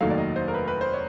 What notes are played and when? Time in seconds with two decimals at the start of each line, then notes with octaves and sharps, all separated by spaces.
0.01 F1 D#2 D#3 F#3 A3 F5
0.10 D5
0.18 D#5
0.36 C5
0.48 A#4
0.54 B4
0.68 B4
0.81 C5
0.93 C#5